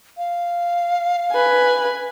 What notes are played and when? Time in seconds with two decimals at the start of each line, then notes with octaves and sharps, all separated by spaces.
0.17 F5
1.31 B4 G#5